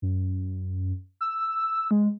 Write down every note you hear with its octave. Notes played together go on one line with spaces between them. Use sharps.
F#2
E6
G#3